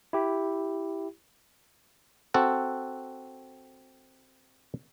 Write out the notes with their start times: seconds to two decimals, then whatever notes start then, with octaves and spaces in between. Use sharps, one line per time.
0.13 E4 G4
2.34 C4 F#4 A4 F#5